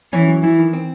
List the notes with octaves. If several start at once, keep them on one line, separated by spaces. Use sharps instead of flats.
E3 C#4
F#3
E3 E4
D#3
C4